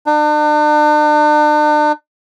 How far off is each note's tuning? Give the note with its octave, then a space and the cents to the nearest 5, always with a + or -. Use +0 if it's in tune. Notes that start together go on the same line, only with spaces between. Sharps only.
D4 +40